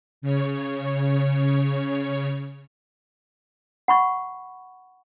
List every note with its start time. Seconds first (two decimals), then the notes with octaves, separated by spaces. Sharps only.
0.22 C#3 C#5
3.88 F#5 B5 C#6